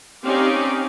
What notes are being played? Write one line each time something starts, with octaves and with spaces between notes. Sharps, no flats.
C4 C#4 D#4 G4 D5 F5